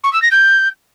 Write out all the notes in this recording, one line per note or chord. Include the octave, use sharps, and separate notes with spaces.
C#6
E6
A#6
G6